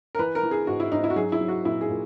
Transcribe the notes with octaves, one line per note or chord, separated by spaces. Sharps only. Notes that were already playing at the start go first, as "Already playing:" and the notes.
A#4
E3 B4
A#4
E3
G#4
G#2 F#4
E4
G#2 D#4
E4
F#4
F#3 G#4
E4
F#3
F#4
A#2 E4
G#4
A#2